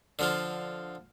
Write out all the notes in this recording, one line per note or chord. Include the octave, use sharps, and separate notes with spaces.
D3 F3 F4